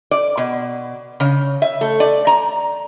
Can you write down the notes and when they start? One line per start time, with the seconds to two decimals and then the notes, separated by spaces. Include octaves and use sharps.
0.11 D5
0.37 B2
1.20 C#3
1.62 E5
1.81 A3
2.00 D5
2.27 A#5